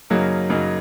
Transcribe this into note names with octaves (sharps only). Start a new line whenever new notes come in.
F#2 C#3 F#3 A#3 D#4
F#2 C#3 F#3 A#3 D#4